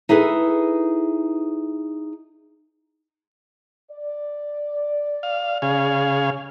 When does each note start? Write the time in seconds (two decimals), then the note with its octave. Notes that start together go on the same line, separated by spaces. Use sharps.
0.09 D#4 E4 G#4 A4 B4
3.91 D5
5.23 F5
5.62 C#3 G#4 F5